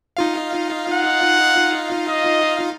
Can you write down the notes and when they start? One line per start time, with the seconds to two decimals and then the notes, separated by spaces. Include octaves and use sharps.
0.17 D#4 F4 F5
0.93 F#5
2.09 D#5